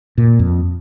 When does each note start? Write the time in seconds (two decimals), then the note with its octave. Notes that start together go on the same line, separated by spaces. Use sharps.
0.18 A#2
0.39 F2